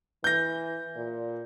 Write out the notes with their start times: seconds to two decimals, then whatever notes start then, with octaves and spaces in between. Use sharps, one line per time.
0.24 E3 G6 A#6
0.96 A#2